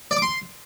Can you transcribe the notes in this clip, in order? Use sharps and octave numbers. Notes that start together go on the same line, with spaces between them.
D5
D6
C6